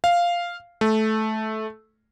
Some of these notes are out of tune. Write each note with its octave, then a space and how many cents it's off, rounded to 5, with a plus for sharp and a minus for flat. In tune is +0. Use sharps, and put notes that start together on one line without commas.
F5 -5
A3 -15